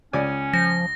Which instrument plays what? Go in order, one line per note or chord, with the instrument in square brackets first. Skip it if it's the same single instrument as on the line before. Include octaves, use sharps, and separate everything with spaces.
[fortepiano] C#2 D5 G#5 [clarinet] C#4
[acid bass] F3 [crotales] A#6